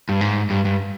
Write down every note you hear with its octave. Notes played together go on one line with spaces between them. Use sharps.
G2
G#2
G2
G2